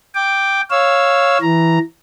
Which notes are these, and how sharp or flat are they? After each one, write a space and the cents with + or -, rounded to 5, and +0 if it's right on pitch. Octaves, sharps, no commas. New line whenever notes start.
G5 +0 D6 +0
C#5 +0 F5 +0 E6 +0
E3 +0 A#5 +0